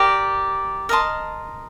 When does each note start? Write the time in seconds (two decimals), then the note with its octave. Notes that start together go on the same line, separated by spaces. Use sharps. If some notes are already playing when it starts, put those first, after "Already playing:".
Already playing: G4 A#4 D5
0.89 A#4 D#5 A5 C6